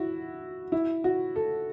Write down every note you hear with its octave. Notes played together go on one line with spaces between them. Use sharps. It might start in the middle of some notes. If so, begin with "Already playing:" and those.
Already playing: E4 F#4
E4
F#4
A4